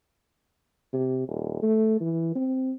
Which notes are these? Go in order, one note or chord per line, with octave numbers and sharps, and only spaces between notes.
C3
D#1
A3
E3
C4